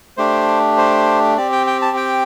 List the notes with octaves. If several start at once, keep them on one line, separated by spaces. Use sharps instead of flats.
A3 D4 G4 C5
C5
C4 G4 D5
G5
G5
A5
G5